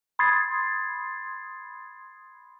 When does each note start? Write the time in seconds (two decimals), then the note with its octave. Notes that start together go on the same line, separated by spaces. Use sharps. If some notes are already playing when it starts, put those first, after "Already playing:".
0.19 B5 C6 D#6 G#6 A6 C7